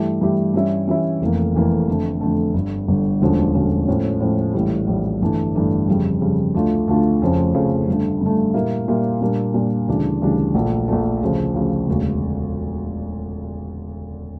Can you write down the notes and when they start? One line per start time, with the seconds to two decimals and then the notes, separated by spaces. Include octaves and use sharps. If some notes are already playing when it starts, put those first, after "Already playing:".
Already playing: G2 E3 A3 E4 G4
0.21 G2 E3 A3 E4 G4
0.54 G2 E3 G3 C#4 E4
0.87 G2 E3 G3 C#4 E4
1.22 F1 F2 E3 A#3
1.54 F1 F2 E3 A#3
1.87 F2 D3 A3
2.21 F2 D3 A3
2.54 G1 G2 D3
2.88 G1 G2 D3
3.21 E1 D2 D3 F3 C#4
3.54 E1 D2 D3 F3 C#4
3.87 A2 F3 C#4
4.20 A2 F3 C#4
4.54 A#1 A2 E3 G3
4.87 A#1 A2 E3 G3
5.21 G1 G2 E3 A3 D4
5.55 G1 G2 E3 A3 D4
5.88 F2 C#3 G3
6.21 F2 C#3 G3
6.55 D2 D3 A3 D4 F4
6.88 D2 D3 A3 D4 F4
7.21 F1 F2 C#3 F3 C#4
7.54 F1 F2 C#3 F3 C#4
7.88 G2 D3 A3
8.21 G2 D3 A3
8.54 A#2 G3 A#3 E4
8.88 A#2 G3 A#3 E4
9.21 A#2 G3 A#3 D4
9.54 A#2 G3 A#3 D4
9.88 D2 C#3 E3 G3 D4
10.22 D2 C#3 E3 G3 D4
10.55 A#1 A#2 A3
10.88 A#1 A#2 A3
11.22 D2 C#3 F3
11.54 D2 C#3 F3
11.87 E1 D2 C#3